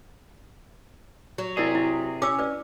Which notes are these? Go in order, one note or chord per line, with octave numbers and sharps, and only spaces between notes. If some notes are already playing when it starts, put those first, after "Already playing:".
F#3
C3 E4 G#4 A#4 D5
E4
C#4 D6 E6
B4 D5